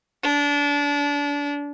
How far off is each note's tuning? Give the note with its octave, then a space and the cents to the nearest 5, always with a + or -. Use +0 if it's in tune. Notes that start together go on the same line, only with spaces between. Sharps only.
D4 -30